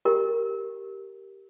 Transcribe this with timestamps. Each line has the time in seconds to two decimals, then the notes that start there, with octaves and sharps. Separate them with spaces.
0.05 G4 A#4